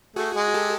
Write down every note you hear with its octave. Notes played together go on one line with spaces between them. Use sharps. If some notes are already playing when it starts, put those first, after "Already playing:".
A3 F#4 G#4
G#3
G4 A4